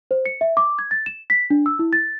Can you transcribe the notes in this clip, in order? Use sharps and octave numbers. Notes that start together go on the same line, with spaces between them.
C5
C#7
E5
D6
G#6
A6
E7
B6
D4
E6
E4
A6